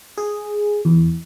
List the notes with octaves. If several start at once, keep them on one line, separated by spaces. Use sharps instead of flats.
G#4
E2